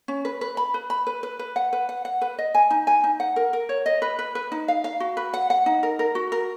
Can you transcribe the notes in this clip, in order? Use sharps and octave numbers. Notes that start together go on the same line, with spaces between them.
C#4
B4
B4
B5
B4
B5
B4
B4
B4
F#5
B4
F#5
F#5
B4
D#5
G#5
D#4
G#5
D#4
F#5
A#4
A#4
C#5
D#5
B4
B4
B4
D#4
F5
F5
F#4
B4
F#5
F#5
D#4
A#4
A#4
F#4
A#4